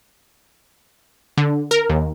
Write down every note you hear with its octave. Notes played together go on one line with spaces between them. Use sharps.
D3
A#4
D#2